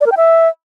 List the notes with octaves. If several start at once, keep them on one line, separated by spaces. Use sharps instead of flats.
D5
A#4
G5
E5